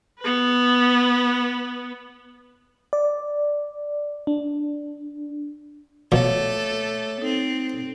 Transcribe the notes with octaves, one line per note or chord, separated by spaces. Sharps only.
B3 B4
D5
D4
C#2 B2 F3 A3 A4 C#5 D6
C4 D#4 A4